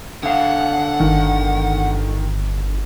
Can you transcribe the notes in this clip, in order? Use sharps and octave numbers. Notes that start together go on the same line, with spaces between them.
D3 F5 F#5
G1 D#3